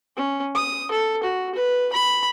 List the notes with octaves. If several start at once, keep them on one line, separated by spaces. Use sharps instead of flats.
C#4
D#6
A4
F#4
B4
B5